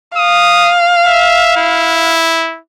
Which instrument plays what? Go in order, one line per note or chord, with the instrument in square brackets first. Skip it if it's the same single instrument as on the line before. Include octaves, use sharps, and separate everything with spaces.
[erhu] F5 [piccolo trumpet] D#6
[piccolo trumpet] E5
E4